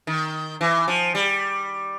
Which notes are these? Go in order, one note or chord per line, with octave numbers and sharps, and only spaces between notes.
D#3
E3
F3
G3